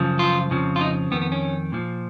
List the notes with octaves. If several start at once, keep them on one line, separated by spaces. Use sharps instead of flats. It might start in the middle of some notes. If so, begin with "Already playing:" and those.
Already playing: F#2 C#3 F3
F4
F2 C#3 F3
F4
D#4
F2 D#3 B3
B3
C#4
A#2 F3